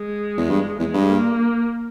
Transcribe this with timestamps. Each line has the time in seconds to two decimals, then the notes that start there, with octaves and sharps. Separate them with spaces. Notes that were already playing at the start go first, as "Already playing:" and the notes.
Already playing: G#3
0.37 E2
0.50 G2
0.79 E2 G#3
0.94 G2
1.09 A#3